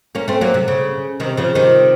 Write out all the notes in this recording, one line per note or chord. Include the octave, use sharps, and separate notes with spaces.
A#3 C#4
A3 C4
F#3 A#3
C3
C#3
C3 D#3
C#3 F3
C3 D#3